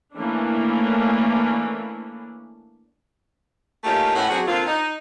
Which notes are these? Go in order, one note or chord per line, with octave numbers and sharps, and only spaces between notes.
E3 A3 A#3 C#4 D4 E4
A3 A#3 C#4 D#4 F4 G4
A2 C#4 B4 F#5
F#3 C4 D4 F#4 G#4
D3 A#3 C4 F4
D#4